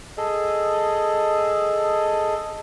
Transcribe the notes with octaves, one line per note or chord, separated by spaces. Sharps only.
G#4 A4 D#5